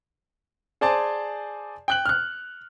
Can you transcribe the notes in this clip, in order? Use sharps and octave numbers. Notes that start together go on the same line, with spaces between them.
G#4 C5 D5 G#5 A5
G5 F#6 F#7
F6 F#6